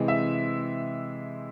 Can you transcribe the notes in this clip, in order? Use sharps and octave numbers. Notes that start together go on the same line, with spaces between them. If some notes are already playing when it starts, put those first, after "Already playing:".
Already playing: C3 E3 G#3 C4
E5